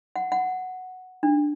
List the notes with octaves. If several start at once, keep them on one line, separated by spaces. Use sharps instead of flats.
F#5
F#5
D4